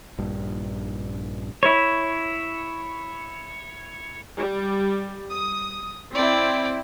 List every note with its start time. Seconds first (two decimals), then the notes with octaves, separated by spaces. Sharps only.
0.18 A#1 G2
1.63 E4 C#5
4.38 G3
5.31 D#6
6.14 C4 E4 D5 G5